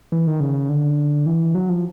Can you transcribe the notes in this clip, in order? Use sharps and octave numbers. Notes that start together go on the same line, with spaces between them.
E3
D#3
C#3
D3
E3
F#3
F3